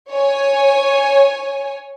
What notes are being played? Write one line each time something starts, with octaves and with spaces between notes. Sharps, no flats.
C#5 G#5